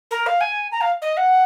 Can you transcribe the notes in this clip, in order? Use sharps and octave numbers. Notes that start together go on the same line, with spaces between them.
A#4
F5
G#5
A#5
F5
D#5
F#5